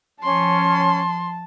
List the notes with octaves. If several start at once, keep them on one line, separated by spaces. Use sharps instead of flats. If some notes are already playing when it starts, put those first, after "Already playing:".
F3 C#4 A5 C6